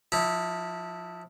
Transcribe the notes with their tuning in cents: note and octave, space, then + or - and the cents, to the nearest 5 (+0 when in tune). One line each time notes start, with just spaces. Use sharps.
F3 +20 E4 -20